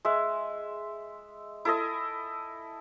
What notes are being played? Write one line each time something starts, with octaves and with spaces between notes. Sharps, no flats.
G#3 E5
E4 A4 D#5